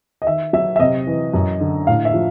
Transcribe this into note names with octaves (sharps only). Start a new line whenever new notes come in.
D#5
D#3 E5
F#3 E5
E5
C3 D#5
E3
F#2
D3
A2 F5
E5
F3